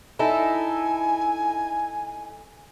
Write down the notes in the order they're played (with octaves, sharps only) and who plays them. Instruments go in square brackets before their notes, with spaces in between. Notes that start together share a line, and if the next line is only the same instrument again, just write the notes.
[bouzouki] D#4 E4 A4 [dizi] G#5